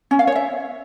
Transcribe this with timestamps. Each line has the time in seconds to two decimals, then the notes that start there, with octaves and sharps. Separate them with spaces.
0.11 C#4
0.19 F5
0.27 C#5
0.36 E5